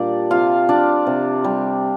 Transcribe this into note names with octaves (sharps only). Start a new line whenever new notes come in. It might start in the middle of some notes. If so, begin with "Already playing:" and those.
Already playing: A#2 G3 D4 D5
C3 F4 F5
F3 D4 D5
C3
G3